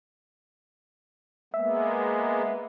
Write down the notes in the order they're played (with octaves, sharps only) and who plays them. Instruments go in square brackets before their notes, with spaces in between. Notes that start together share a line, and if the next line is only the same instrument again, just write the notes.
[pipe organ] G#3 A#3 B3 [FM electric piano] E5